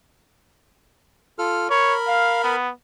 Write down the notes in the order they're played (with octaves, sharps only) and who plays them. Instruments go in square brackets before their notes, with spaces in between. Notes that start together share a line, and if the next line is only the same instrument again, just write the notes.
[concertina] F4 A4 F6
[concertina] A#4 B5 [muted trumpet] C#5
[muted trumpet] F5
B3